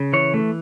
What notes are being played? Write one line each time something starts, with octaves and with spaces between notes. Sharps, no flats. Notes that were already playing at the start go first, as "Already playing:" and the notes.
Already playing: C#3
E3 C#5
A3